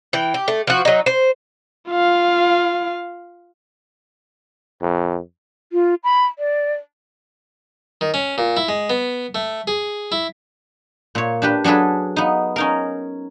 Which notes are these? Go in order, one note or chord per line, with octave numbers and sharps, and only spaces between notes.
E3 G5
G4
A3
F3 F#4
F#3 D#4
C5
F4 F5
F2
F4
B5
D5
D#3
C#4
A#2
E4
G#3
B3
A3
G#4
E4
A#2 C#5
D4 G4 B4
F#3 D4 G#4 A4 B4
B3 D#4
C#4 D#4 A#4